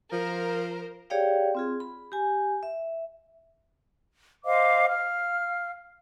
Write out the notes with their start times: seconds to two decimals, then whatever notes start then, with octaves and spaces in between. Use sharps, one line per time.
0.12 F3 A#4 C5
1.10 G4 G#4 C#5 D5 F5 G5
1.55 C4 F4 G#4
1.80 B5
2.12 G4 G#5
2.63 E5
4.44 C5 D#5 F5 D6
4.88 F5 F6